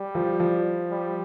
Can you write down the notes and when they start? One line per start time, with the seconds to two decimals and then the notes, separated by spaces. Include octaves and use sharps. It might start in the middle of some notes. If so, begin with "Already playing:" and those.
Already playing: G3
0.15 F3
0.40 F3
0.91 G3